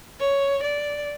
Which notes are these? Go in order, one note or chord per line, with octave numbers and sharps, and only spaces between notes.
C#5
D5